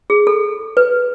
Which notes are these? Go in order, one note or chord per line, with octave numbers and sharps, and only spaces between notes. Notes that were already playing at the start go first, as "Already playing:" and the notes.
G#4
A4
B4